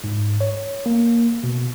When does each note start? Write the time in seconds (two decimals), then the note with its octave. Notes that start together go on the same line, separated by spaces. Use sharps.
0.04 G#2
0.41 C#5
0.86 A#3
1.43 B2